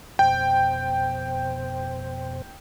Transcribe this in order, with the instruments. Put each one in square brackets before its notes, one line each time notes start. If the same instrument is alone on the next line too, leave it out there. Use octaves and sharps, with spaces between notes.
[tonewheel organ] F2 B2 C5 [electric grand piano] G5